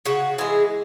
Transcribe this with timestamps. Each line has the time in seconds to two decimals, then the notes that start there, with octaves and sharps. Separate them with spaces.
0.06 C#3 F#4
0.38 E3 G#3 G#4